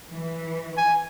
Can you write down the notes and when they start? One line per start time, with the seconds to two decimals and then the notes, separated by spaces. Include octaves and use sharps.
0.11 E3
0.77 G#5